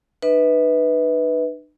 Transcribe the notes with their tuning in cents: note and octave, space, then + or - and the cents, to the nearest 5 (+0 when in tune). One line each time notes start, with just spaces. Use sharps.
D#4 -45 B4 +0 E5 -40